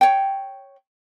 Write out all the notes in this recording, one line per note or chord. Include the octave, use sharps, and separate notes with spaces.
C#5 G5